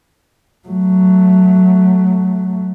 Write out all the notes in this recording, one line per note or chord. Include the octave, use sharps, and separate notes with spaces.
F#3 A3